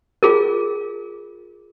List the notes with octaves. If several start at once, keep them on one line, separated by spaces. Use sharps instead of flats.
F4 G#4 A#4